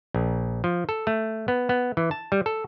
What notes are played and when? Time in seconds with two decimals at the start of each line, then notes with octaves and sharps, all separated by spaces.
0.14 A#1
0.64 F3
0.89 A4
1.07 A3
1.48 B3
1.69 B3
1.97 E3
2.11 A5
2.32 G3
2.46 A4